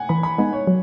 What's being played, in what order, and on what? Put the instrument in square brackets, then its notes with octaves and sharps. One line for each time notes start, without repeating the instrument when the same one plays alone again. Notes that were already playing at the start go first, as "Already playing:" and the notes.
Already playing: [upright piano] F#5 G#5
[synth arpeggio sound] E3 [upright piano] B5
[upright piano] B5
[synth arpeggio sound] G#3 B3 D#4 [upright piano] G#5
[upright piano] C#5
[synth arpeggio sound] F#3